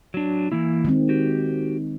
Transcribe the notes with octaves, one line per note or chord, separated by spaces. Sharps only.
F#3 D4
E3 A#3 E4
D#3 G#3 C4
F#4 G4